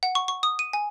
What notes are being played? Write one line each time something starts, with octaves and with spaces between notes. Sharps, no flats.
F#5
C#6
C#6
D#6
D#7
G#5